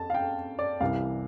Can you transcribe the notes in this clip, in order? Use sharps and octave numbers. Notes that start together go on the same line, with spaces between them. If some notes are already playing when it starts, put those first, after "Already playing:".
Already playing: F2 A5
F5
G5
D5
C2 C3 E3 F5